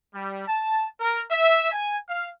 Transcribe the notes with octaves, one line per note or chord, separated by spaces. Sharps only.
G3
A5
A#4
E5
G#5
F5